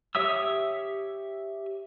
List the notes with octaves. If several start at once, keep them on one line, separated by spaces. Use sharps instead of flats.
G4 C#5 E5 D#6 E6